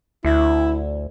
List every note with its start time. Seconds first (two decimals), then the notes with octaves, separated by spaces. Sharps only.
0.24 D2 E4